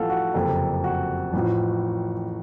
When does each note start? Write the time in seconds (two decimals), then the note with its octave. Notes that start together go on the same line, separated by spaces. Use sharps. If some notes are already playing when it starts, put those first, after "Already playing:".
Already playing: A1 A2 F3 A4 F5 F#5
0.10 F#4
0.34 F#1 F2 C3 A4
0.84 F#4
1.33 A1 A2 F3